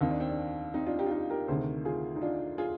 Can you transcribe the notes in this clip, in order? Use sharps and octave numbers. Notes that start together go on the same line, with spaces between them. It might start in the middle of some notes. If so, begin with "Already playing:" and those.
D#2 D#3 C4 D#4
D4
C4
D4
C4 D#4
D4 F4
D#4 G4
F4
D#4 G4
G4 A#4
D2 C3 D#3 G#4 C5
F4 G#4
D#4
D4 F4
F4 G#4